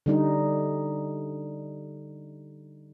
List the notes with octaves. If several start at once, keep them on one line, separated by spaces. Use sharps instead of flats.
D3 G3 D#4